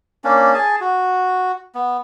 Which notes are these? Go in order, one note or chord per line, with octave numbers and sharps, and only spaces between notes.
A#3 C#4 D4
G#4 G#5 A5
F#4
B3